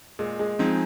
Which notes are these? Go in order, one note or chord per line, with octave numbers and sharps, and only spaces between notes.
A#2 G#3
G#3
F3 G#3 C4 D#4 G#4